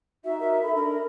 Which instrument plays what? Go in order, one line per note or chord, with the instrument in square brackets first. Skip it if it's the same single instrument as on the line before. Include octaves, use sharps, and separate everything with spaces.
[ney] D#4 [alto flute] F#4 [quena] E5
[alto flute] A#4
[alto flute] A4 [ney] B5
[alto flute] D4 [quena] A#4